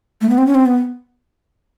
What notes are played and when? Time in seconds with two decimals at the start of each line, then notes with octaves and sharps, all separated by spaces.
0.21 A3
0.29 B3
0.38 C4
0.47 C#4
0.55 C4
0.66 B3